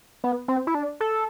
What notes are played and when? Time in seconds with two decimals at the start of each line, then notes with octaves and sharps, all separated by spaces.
0.24 B3
0.48 C4
0.67 E4
0.75 D4
1.01 A4